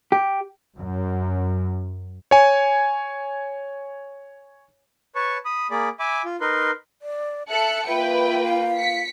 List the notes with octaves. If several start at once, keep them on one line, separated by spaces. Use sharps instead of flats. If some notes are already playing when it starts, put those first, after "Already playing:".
G4
F#2
C#5 G#5
B4 C#5 A5 C#6
B5 D#6
A#3 G#4 D5 B5
E5 G#5 B5 D6
F4
D#4 A#4 B4 C6
D5
A4 E5 F#6 C#7
A#3 F4 B4 E5 G5
F5
B6 C#7